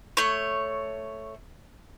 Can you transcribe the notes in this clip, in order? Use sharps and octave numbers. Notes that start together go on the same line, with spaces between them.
A3 C#5